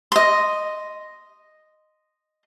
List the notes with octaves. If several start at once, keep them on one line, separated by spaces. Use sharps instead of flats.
D#5 C6